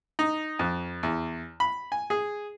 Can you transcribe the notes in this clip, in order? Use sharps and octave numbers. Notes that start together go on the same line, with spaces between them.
D#4
F2
E2
B5
G#5
G#4